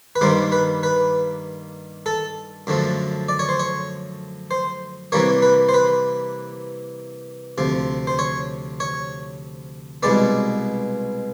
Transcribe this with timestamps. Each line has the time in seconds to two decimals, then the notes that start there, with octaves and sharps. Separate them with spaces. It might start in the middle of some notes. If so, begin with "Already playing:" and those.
0.16 B4
0.21 G2 D#3 G3 A#3 C5
0.52 B4
0.83 B4
2.06 A4
2.67 F#2 D3 F3 A3
3.28 D5
3.39 C#5
3.49 C5
3.59 C#5
4.51 C5
5.12 C3 E3 G3 A#3 C#5
5.42 B4
5.69 C5
5.74 B4
7.58 D2 C3 F3
8.07 C5
8.19 C#5
8.80 C#5
10.03 C2 B2 G#3 B3 D5